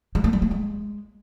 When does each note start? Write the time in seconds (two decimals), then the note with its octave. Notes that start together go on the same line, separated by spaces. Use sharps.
0.15 G#3
0.24 A3
0.33 G3
0.42 A3
0.51 G#3